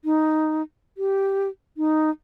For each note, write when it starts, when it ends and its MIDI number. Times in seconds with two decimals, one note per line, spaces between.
0.05 0.62 63
0.97 1.48 67
1.77 2.10 63